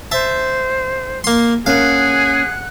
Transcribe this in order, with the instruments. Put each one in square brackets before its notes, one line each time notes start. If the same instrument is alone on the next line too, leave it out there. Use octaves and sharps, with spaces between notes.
[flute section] C5 [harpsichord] E5 A5
[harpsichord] A#3 C6
[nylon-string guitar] A#3 C#4 [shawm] G#4 [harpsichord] F5 [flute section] F#5 F#6